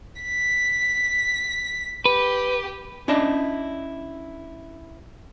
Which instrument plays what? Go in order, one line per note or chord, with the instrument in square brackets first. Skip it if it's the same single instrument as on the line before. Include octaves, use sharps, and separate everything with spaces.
[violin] B6
[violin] G4 [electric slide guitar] B4
[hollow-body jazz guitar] C#4 D4 E4 D5 D#5 A5